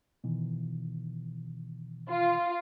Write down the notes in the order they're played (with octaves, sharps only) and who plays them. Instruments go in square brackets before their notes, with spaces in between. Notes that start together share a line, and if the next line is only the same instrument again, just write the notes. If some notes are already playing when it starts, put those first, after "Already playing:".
[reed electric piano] B2 D#3 E3
[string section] F4